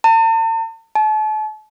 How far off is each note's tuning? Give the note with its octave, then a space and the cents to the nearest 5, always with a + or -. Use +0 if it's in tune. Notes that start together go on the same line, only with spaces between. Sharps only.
A5 +45
A5 -40